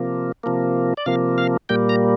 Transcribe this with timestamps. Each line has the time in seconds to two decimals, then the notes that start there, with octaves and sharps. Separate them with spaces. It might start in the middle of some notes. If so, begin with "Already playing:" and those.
Already playing: C3 F3 A#3
0.43 C3 F3 A#3
0.97 D5
1.06 C3 F3 A#3 F5
1.38 F5
1.69 A#2 G3 A#3 G5
1.89 A#5